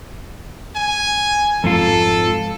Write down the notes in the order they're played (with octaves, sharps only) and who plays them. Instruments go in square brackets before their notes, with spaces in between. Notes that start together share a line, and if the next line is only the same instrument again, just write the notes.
[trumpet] G#5
[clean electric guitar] F2 G#2 F4 [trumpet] A4